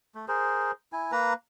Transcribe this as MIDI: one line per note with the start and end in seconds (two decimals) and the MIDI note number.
0.15 0.26 57
0.28 0.72 68
0.28 0.72 70
0.28 0.72 72
0.93 1.11 64
0.93 1.11 80
1.12 1.33 58
1.12 1.33 71
1.12 1.33 82